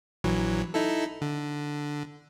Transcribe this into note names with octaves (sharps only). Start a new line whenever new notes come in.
A#1 E3 F#3
D#4 E4 A4
D3